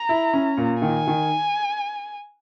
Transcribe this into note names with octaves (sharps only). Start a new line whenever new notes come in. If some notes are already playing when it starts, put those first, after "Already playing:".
Already playing: A#5
E4
C#4
A#2
D#3 G#5
D#3